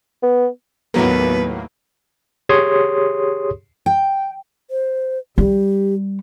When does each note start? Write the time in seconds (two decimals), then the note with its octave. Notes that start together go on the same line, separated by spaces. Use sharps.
0.23 B3
0.94 D#2 A2 F#3 A#3 B3 B4
2.49 G4 G#4 C#5 C6 D#6
3.86 G5
4.71 C5
5.38 G3 G4